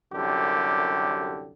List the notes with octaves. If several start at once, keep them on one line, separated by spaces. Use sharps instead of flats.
C2 F#2 D3 G4